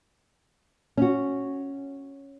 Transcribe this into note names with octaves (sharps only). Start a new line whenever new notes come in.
C#4 F#4